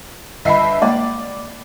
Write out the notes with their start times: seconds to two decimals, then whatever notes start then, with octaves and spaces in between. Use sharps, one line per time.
0.45 G1 D#5 E5 B5 C7
0.82 G#3 A#3 D5